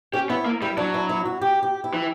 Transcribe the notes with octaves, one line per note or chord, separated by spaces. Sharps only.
C#4 G4
B3 E4
A#3
G3 E4
F#3 D4
E4
E4
F#4
G4
G4
E4
E3